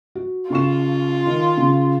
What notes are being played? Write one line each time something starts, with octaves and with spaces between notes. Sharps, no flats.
F#4
C#3 F4 C#6 E7
D#3
C#3